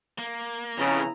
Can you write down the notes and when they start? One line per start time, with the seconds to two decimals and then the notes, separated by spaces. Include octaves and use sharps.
0.19 A#3
0.78 F2 C#3 B3 E4 A#5